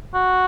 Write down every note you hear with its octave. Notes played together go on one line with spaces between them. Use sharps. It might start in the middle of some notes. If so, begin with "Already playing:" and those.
F#4